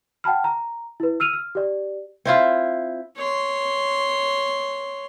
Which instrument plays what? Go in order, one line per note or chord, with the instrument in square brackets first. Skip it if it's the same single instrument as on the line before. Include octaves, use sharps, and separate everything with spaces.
[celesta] F#5 G5 A5 B5 F6
A#5
E4 B4
E6 F6 D#7 F7
F6
G4 D5
[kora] C4 E4 F4
[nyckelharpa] C#5 C6